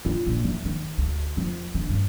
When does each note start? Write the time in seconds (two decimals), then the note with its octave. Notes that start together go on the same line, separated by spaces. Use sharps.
0.05 F4
0.26 A#1
0.44 E3
0.65 D#3
0.98 D2
1.37 F2
1.74 D3
1.89 G2